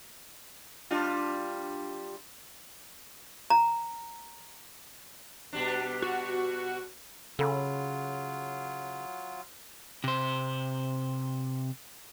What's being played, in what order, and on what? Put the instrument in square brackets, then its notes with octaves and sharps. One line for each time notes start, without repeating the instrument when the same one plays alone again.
[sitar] G3 D4 F4
[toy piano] A#5
[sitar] B2 G3 D4
[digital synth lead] F#4
[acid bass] C#3 [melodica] F#3 F4 [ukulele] A4 B5
[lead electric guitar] C3 C5